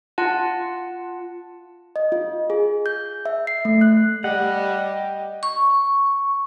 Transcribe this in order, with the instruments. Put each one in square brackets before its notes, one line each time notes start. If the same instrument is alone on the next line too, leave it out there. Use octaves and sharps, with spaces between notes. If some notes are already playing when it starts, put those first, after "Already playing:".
[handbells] F4 F#5 A5
[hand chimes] D#5
F4
G#4
G6
E5
C7
A3
F#6
[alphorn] G3 [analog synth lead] G4 [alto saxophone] D#5 [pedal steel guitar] F#5
[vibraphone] C#6